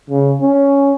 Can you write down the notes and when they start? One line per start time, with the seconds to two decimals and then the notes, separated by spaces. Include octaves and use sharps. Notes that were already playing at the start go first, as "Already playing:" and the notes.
0.10 C#3
0.41 C#4